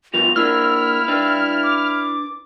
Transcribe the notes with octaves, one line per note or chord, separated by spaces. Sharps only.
B2 F3 B3 F4 F#4 B4 F7
A#3 D4 E4 E6 F6
D4 B4
D6